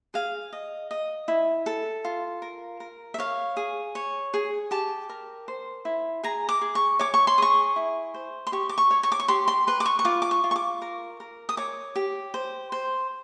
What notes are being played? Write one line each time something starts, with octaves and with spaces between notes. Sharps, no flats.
G#4 F5
D#5
D#5
E4
A4
F4
A#4
A#4
E5
C#5 F5
G#4
C#5
G#4
G4 A5
A#4
C5
E4
G#4 A#5
D6
G#4
C#6
C#5 D6
C#6
C6
G#4 C#6
E4
C5
C6
G4 C#6
D6
C#6
C#5
C#6
D6
C#6
G4 C6
C6
B4 C6
D6
C#6
C#6
F4 D6
D6
C#6
F4
C#6
D6
A#4
A#4
D#6
C#5 D6
G4
C5
C5